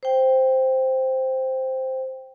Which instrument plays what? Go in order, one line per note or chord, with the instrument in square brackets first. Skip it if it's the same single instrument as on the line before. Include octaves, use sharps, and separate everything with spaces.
[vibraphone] C5 G5